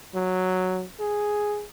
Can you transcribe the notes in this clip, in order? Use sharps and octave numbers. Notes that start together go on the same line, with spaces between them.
F#3
G#4